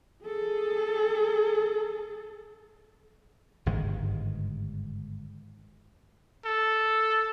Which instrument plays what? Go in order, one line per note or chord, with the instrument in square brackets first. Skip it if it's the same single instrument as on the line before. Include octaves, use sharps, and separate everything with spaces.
[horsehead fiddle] G#4 A4
[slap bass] G1 G#2 D#3 G#3
[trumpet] A4